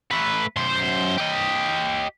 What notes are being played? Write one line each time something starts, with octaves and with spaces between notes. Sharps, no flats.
A3 B4
F#2 C5
G4 D#5